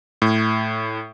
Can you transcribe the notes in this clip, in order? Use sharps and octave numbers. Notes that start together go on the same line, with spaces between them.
A2